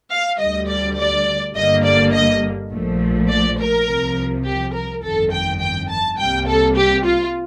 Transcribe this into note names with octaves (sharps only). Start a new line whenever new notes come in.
F5
D2 D3 G3 D#5
D5
D5
G1 G2 D3 G3 A#3 D#5
D5
D#5
A#1 A#2 F3 A3
D5
A#4
C2 C3 F3
G4
A#4
G1 F2 D#3 A4
G5
G5
A5
C2 C3 G3 A#3 G5
A4
G4
F4